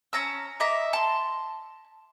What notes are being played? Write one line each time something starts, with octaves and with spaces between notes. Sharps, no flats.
C#4 A5 A#5 E6
D#5 E5 A#5 D6
A5 C6